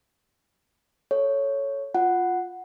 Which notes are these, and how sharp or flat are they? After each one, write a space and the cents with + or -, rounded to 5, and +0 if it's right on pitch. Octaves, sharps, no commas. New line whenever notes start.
A4 +0 C#5 +0
F4 +10 F#5 +0